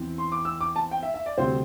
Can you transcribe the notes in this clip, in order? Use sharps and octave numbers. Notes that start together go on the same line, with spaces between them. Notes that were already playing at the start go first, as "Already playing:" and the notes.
Already playing: E2 E3 C4
C6
D6
E6
D6
A5
G5
E5
E5
D5
D2 C3 G3 C4 C5